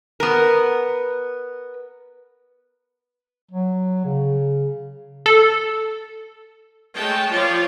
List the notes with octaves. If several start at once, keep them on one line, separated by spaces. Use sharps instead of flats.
B3 A#4
F#3
C#3
A4
G#3 A3 C#5 G5 A5
F3 F4 C#5 D5